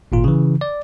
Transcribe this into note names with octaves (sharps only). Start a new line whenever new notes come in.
G#1 A#2 F4
C#3 E3
D5